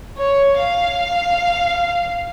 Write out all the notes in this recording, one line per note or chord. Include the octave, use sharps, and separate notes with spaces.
C#5
F5